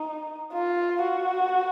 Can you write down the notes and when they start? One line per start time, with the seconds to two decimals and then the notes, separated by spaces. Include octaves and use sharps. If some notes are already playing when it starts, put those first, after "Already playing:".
Already playing: D#4
0.53 F4
1.02 F#4